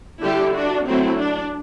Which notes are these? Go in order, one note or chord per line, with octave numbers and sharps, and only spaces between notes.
D3 G3 D4 E4 G4
D4 F#4
F#3 A3 C4 E4
D4